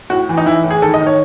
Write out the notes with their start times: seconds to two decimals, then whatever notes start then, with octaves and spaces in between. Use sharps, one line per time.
0.10 A2 F#4
0.29 E3
0.37 D#4
0.46 E3 E4
0.64 A2
0.70 G#4
0.82 D#3 A4
0.94 D#5
1.00 D#3
1.07 C#5